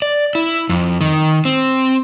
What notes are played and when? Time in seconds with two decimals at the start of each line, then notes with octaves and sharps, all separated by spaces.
0.02 D5
0.35 E4
0.69 F2
1.01 D#3
1.45 C4